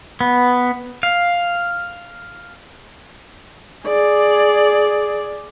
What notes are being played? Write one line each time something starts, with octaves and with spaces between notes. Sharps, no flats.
B3
F5
G#4 D5